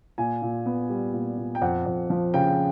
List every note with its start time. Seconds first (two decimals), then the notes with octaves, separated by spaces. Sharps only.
0.18 A#2 G#5
0.42 A#2
0.66 B3
0.90 G3
1.14 A#2
1.38 A#2
1.55 G5
1.61 F2 F#5
1.86 F2
2.10 F3
2.34 C#3 G5